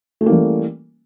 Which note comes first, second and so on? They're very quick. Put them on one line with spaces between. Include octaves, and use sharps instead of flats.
A3 C#4 A#3 E3 G3